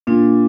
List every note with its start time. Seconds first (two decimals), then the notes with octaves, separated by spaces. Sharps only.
0.07 A#2 D4